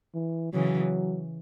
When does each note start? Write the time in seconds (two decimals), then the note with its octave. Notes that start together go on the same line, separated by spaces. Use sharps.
0.15 E3
0.53 C#3 E3 F#3